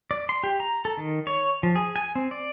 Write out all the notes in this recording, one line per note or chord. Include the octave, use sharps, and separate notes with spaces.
D5
C6
G4
A#5
A4
D#3
C#5
F3
G#4
G#5
C4
D5